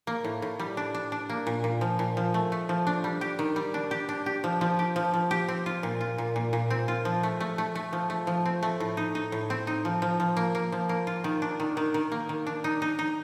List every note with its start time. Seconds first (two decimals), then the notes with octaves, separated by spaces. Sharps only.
0.07 A#3
0.24 A2
0.42 A2
0.60 G3
0.77 D4
0.95 D4
1.12 D4
1.30 A#3
1.47 A#2
1.64 A#2
1.81 F3
1.99 A#2
2.17 F3
2.34 A3
2.52 A3
2.69 F3
2.87 D4
3.04 G3
3.21 G4
3.39 D#3
3.56 G3
3.74 D4
3.91 G4
4.09 D4
4.26 G4
4.44 F3
4.61 F3
4.79 G4
4.96 F3
5.14 F3
5.31 G4
5.48 C4
5.66 F4
5.83 A#2
6.01 F4
6.18 A#2
6.36 A#2
6.53 A#2
6.70 C4
6.88 F4
7.05 F3
7.23 A3
7.40 A3
7.58 A3
7.75 A3
7.93 F3
8.10 A3
8.27 F3
8.45 C4
8.63 A3
8.80 A2
8.97 D#4
9.15 D#4
9.32 A2
9.50 C4
9.67 D#4
9.85 F3
10.02 F3
10.20 F3
10.37 A#3
10.55 A#3
10.72 F3
10.89 A#3
11.07 F4
11.24 D#3
11.42 D4
11.60 D#3
11.77 D#3
11.94 D#3
12.12 A#3
12.29 D#3
12.47 D4
12.64 D#4
12.82 D#4
12.99 D#4